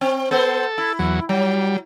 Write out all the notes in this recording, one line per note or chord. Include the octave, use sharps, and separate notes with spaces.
C4
B3 A4 C5
E4
E2 F#3
F#3 G3